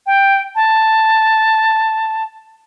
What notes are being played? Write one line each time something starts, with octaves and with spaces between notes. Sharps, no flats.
G5
A5